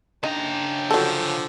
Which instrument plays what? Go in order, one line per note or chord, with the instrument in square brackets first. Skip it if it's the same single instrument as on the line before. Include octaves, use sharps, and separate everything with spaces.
[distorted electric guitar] C#3 A#5 [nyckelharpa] D4 G5 [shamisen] D#4
[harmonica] D3 F3 [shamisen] F#3 A4